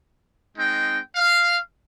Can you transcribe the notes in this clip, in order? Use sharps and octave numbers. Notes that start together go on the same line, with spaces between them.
G#3 C4 D#4 G5
F5